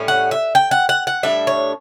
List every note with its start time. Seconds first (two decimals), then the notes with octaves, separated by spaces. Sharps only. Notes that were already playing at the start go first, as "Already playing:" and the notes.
Already playing: A2 G3 C#4
0.08 F#5
0.31 E5
0.55 G5
0.71 F#5
0.89 F#5
1.07 F#5
1.23 A2 G3 D4 E5
1.47 C#5